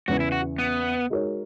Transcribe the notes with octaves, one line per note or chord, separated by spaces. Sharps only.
E2 C#3 E3 F#4
E4
F#4
B3
G#3 D#4 F#4 A#4 C#5